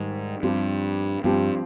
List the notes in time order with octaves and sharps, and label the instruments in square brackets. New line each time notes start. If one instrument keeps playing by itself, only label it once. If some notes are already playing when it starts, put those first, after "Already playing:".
Already playing: [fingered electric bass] G#2 [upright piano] D#3 G3
[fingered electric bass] G2 [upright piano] F3 C4 G4
[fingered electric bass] G2 [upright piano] F3 C4 G4